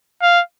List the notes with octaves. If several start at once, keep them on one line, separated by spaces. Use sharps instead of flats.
F5